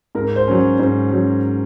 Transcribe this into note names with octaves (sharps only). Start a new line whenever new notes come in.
G#2 A#4
C5
F#3 C#4
C#5
G#2 C5
F#3 C#4